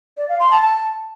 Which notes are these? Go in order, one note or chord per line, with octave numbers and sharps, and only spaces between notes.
D5
F5
C6
A5
A5